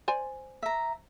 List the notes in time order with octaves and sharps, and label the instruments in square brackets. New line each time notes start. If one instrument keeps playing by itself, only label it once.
[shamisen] C5 D5 G#5
[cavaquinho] E5 A#5